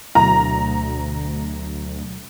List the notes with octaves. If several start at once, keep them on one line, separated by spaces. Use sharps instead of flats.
D2 B2 F#3 A#5